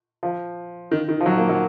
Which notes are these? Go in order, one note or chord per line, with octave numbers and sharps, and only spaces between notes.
F3
D#3
D#3
F3
F#3
A#3
F#3